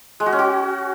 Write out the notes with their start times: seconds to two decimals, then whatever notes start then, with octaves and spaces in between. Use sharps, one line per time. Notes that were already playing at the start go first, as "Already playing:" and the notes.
0.20 G#3
0.26 F#4
0.32 C#4
0.39 F#4